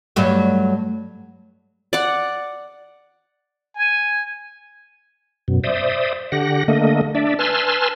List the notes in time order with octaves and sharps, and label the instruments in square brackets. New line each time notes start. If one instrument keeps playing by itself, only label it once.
[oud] G2 F#3 A3
[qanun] D5 F#5
[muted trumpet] G#5
[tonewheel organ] F#2 B2
C5 D5 E5 D#6
D3 G4 F#5 A#6
D3 A3 A#3 D#5
D4 D5 E5
B4 G#5 A5 C6 E6 F6